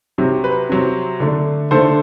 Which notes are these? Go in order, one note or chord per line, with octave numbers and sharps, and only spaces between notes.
C3 F#3 C4
B4
C3 F#3 C4
D3 A3 D4
D3 A3 D4 A4 C5